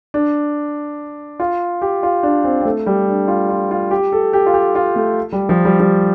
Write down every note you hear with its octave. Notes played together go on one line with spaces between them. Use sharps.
D4
F4
G4
F4
D4
C4
C4
A3
G3
D4
F4
F4
F4
G4
A4
G4
F4
G4
F4
A3
G3
F3
G3
G3